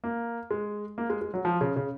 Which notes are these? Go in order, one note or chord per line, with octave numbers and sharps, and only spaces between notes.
A#3
G#3
A#3
G#3
G#3
F#3
F3
C#3
C#3